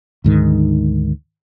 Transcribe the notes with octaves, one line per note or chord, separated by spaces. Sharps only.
D2 G#2 D#3